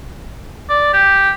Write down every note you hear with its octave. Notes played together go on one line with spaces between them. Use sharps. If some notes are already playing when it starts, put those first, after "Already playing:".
D5
G4